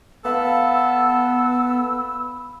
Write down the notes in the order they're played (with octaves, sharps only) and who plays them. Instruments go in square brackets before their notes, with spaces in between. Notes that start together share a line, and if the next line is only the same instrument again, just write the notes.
[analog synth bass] B3 [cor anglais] A4 [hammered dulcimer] B4 F5 B5 [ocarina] E6